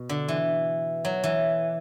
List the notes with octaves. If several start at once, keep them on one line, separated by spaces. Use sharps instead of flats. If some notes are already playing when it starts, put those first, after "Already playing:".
Already playing: B2
D3
E3
F#3
E3